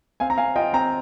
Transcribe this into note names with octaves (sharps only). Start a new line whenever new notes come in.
C4 F5 G#5
A#5
C4 F5 G#5
F4 D#5 G5
C4 G5 A#5